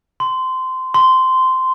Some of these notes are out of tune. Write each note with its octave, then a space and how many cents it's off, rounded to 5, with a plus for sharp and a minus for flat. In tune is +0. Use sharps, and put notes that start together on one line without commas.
C6 -20
C6 -15